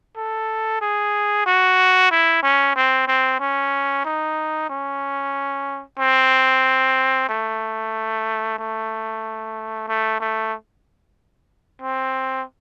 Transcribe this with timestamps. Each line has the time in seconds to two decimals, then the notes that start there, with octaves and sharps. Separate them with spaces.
0.17 A4
0.81 G#4
1.46 F#4
2.11 E4
2.43 C#4
2.76 C4
3.08 C4
3.40 C#4
4.05 D#4
4.70 C#4
5.99 C4
7.29 A3
8.58 A3
9.88 A3
10.20 A3
11.81 C4